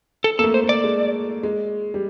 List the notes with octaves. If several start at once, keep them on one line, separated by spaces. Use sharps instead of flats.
A4
A#3 A4
A3
C5
A3
D5
G#3
G#3
G3